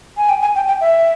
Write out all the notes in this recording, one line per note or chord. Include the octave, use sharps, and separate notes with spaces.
G#5
G5
G#5
G5
G5
E5